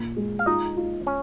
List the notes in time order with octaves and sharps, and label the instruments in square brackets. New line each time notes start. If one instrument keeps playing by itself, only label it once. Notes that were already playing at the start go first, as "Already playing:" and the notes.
Already playing: [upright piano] A#2
G#3
[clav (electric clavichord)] F5
[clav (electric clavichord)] D#4 D#5 [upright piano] F4
[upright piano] F4
[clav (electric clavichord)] C#4